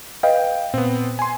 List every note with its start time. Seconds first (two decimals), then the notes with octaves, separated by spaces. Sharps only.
0.23 B4 D#5 F5 G5
0.74 A#2 B3 C4
1.19 G#5 C6